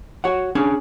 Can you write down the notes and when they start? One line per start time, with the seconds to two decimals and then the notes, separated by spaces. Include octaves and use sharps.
0.24 F#4 C#5 F#5
0.55 C#4 D4 G#4